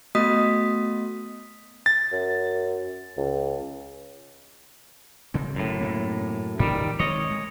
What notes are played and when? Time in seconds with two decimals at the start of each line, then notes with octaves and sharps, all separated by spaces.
0.15 A3 B3 F#4 D#5 D#6 B6
1.86 A6
2.12 F#2
3.17 C#2
5.34 D1 C#3 C4
5.56 F#2 A2
5.81 G2 C3 A#3
6.60 G#2 D#3 E3 G3
6.99 D#3 G#3 C4 C#5 D#5
7.31 G#3